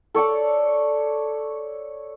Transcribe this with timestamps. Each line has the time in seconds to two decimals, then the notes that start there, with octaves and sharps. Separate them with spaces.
0.14 A4 C#5 D5 A5